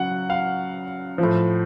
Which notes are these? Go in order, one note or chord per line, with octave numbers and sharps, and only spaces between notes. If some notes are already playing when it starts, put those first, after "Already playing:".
Already playing: C#3 F#3 F#5
F5
F3
A2